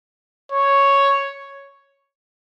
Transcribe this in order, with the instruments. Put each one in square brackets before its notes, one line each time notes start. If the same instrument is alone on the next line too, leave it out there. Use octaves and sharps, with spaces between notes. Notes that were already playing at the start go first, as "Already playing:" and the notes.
[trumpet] C#5